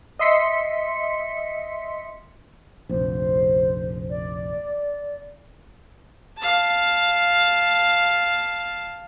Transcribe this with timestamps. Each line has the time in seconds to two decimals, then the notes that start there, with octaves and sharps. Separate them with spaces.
0.19 D#5 E5 C6 B6 C#7
2.89 F1 A#1 C5
4.09 D5
6.38 F5 A5